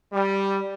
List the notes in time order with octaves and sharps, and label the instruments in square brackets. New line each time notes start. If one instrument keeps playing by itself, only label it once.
[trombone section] G3